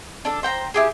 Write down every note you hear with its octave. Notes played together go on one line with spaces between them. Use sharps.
D4 A4
C5 G5 A#5
E4 G4 G#4